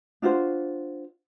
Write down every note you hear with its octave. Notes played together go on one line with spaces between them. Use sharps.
D4 F4 F#4 C5